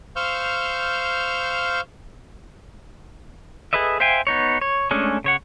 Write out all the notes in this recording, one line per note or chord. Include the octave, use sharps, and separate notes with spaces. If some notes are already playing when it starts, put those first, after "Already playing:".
C5 F5 C#6 E6 F6 G6
G#4 A4 B4 D#5 E5
C5 E5 F5 G5 G#5
B3 D#4 C#5
C#5
G#3 A3 C#4 D4 G#4
C#3 C#5 F#5